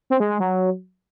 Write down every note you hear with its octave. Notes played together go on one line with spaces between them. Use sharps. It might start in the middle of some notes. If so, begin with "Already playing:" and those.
C4
G#3
G#3
F#3